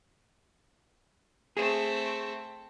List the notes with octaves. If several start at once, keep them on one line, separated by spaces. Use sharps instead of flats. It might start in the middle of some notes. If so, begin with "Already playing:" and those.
A3 C4 G#4